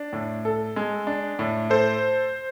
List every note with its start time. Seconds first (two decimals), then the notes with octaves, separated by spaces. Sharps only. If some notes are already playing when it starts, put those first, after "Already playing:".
Already playing: D4
0.13 A2
0.45 A4
0.76 G#3
1.07 D4
1.39 A2
1.70 A4 C5